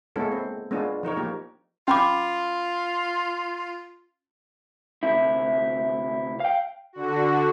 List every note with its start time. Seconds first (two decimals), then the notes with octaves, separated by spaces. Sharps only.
0.16 G#3 A#3 B3 C#4 E4 A4
0.32 C4
0.71 G#3 B3 C#4 D4 F4
1.03 F3 D#4 A#4 C#5
1.17 F3 A#3 G4
1.88 C#4 F4 B5 D6
5.03 D2 C3 E4
6.40 F5 G5
6.93 D3 F#4